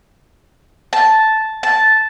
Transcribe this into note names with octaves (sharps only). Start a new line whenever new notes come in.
A5
A5